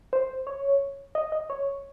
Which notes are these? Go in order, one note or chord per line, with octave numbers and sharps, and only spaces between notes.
C5
C#5
D#5
D#5
C#5